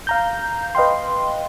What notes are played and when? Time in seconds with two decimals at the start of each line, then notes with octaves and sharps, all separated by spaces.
0.07 F5 A#5 G6
0.75 B4 D#5 F5 G5 C6